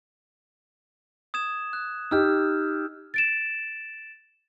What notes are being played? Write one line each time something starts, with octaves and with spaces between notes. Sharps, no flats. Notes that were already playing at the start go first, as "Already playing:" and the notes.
D#6 G#6 E7
F#6
D#4 G4 E6 F6 G6
A6 D7 E7